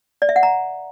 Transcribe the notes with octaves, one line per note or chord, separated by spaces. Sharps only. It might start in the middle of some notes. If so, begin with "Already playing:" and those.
D5
E5
F#5
A#5